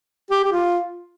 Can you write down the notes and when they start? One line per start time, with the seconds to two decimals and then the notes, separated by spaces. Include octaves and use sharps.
0.31 G4
0.45 G4
0.51 F4